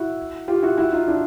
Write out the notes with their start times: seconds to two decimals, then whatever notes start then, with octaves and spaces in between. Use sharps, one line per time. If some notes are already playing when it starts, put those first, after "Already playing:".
Already playing: E4 F#4
0.48 F4 G4
0.63 E4 F#4
0.78 E4 F#4
0.93 D#4 F4
1.08 D4 E4